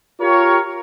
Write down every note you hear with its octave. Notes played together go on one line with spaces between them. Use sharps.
F4 G4 A#4 C#5